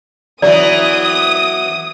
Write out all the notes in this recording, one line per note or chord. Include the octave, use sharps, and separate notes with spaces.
E3 F#3 D5 D#6